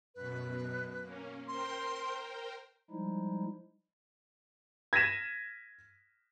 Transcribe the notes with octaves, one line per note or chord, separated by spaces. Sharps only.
F#2 B2 B4
A#3 C#4
A#4 C5 G5 C6
F3 G3 G#3 D#4 E4
G#6 A#6 B6 D#7 E7